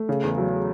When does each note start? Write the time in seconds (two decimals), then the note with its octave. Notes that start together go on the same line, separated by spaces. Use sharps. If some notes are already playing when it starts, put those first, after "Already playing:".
Already playing: A3
0.09 C#3
0.24 E2
0.38 F#3